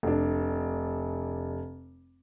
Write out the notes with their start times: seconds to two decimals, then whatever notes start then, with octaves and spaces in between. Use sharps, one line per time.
0.03 F1 D4